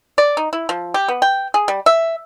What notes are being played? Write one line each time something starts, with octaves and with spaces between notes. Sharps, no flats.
D5
D#4
E4
F3
G4
B3
G5
G#4
G3
E5